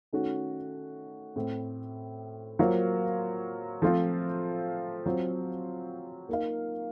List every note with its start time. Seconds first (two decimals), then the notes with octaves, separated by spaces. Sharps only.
0.13 D#3 A3 C#4 F#4
1.36 A2 A3 C4
2.59 F#3 A#3 F4 C5 F5
3.82 F3 A3 C4 F4
5.06 F#3 C4 F4 C5
6.29 A#3 D#4 A#4 F5